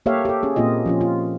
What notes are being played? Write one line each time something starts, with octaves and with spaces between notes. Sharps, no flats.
A#3 G4 A4 C#5 E5 F5
G4 A4
C#4 G#4
A#2 A#3 C4 F4 D#5
F3 C#4 F4
F4